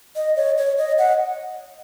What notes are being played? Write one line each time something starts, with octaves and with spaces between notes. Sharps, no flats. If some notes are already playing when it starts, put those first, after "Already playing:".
D#5
C#5
C#5
D#5
F#5